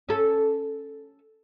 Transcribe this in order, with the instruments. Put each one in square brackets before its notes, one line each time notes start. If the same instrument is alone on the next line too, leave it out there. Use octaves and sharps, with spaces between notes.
[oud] C#4 A4